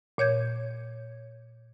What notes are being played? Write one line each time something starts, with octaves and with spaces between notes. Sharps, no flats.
A#2 C#5 G6 G#6